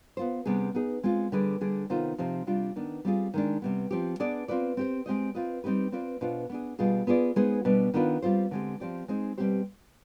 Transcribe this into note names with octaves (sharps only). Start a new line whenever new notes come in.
B3 F4 C5
C3 G3 B3 D4 G#4
B3 D#4 G#4
G#3 C4 F4
D3 G3 D4 G#4 B4
D3 G3 D4 G#4
C3 D#3 B3 F4 C5
C3 F3 C4 D#4 G4
C3 G3 D4 F4
D#3 B3 D4
G3 C4 F4 G#4
D#3 G#3 D4
C3 G3 B3
F3 C4 G4
B3 D4 G#4 D5
C4 F4 B4 D5
C4 G4 C5
G#3 C4 G4 C5 D#5
C4 F4 B4 D#5
G3 C4 D#4 G4 B4
C4 F4 B4 D5
B2 B3 D4 F4 C5
B3 D4 G#4
B2 G3 B3 F4 G#4
B3 F4 G#4 D5
G#3 B3 D#4 G#4 C5
B2 G3 B3 D4
D#3 B3 D4 F4 B4
G3 C4 F4 C5
D3 G#3 C4 G4
F3 C4 G4 D5
G#3 C4 D#4 G#4
B2 G3 C4 G4 C5